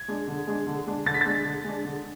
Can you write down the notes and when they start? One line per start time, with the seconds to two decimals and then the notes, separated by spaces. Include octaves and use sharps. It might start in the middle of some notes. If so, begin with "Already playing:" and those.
Already playing: G#6
0.08 G#3 D4
0.28 D3
0.47 G#3 D4
0.67 D3
0.86 G#3 D4
1.06 D3 A6
1.14 B6
1.21 G#3 D4 A6
1.45 D3
1.64 G#3 D4
1.85 D3